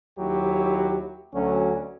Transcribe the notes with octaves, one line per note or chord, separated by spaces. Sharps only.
D#2 F#3 E4 G4
D2 F#3 C#4